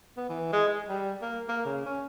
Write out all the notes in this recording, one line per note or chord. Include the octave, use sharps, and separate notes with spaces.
B3
E3
G#3
G#3
G3
A#3
A#3
C#3
C#4